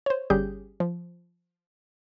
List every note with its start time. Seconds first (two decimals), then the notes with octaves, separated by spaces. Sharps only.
0.06 C5 C#5
0.30 G1 G3 C#4 G4 G#4 G6
0.80 F3